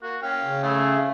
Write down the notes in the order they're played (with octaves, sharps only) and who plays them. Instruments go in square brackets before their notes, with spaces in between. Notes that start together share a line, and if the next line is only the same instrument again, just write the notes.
[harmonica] A#3 [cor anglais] F#4
[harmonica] C#4 G5 [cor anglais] F5
[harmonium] C#3
[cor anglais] A3 [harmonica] E4 G#4